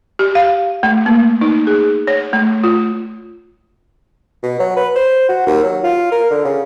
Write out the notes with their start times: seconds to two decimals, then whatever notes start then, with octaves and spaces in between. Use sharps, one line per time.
0.19 G4
0.35 F5
0.83 A3
1.06 A#3
1.41 D#4
1.67 G#4
2.07 C#5
2.33 A3
2.64 F4
4.43 B2
4.59 F#3
4.76 B4
4.96 C5
5.29 F#4
5.47 D#2
5.63 F#3
5.83 F4
6.12 A#4
6.30 D3
6.44 C#3